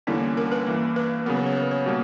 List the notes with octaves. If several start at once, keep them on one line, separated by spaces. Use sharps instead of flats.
E2 D3 G3 A#3 C#4 E4
A#4
B4
G2 E3 A#3
B4
C#3 F#3 B3 A#4
B4
C#5
B4
C#5
B2 G3 A#3